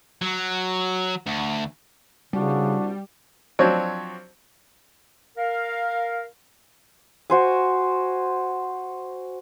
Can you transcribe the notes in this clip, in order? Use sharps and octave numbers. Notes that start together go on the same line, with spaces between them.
F#3
D2
C2 C#3 G3 D4 F#4
F3 F#3 C4 D4 C#5
A#4 F5
F#4 C5 G#5